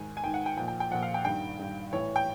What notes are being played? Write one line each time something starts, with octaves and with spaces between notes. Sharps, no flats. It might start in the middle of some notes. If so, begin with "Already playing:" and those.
Already playing: G#2 D#3 G#5
G#5
G#2 D#3 G5
F#5
G5
A#2 F3 G5
G5
G5
A#2 F3 F#5
F5
G5
G2 D#3 G5
G2 D#3
A2 E3 C#5
G5